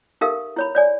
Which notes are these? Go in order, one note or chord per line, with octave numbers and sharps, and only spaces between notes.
D#4 G4 A4 A#4 E5 F5
E4 C#5 B5
C#5 D5 G#5